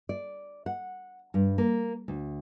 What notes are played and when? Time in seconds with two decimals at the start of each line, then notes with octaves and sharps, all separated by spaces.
0.09 D5
0.66 F#5
1.34 G2
1.58 A#3
2.08 D2